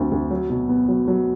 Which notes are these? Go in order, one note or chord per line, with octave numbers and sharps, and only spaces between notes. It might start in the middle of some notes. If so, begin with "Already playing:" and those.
Already playing: D2 C4
D2
F#3
B2
B3
F#3
F#3